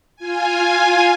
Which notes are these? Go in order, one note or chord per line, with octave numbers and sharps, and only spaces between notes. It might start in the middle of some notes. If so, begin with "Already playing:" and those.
F4 G#5